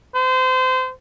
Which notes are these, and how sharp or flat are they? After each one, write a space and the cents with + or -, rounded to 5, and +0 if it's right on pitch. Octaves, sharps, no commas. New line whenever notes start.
C5 -30